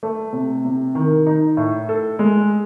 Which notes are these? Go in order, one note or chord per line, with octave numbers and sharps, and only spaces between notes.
A3
C3
C3
D#3
D#4
A2
A4
G#3